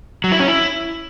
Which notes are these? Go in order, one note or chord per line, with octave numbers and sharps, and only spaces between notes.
F#3
E4
C#4
E4